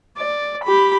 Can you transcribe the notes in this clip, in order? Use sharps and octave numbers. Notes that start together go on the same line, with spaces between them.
D5
G4 B5